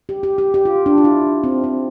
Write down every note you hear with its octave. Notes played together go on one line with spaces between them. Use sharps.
G4
G4
G4
G4
F4
D4
F4
E4
C4
C4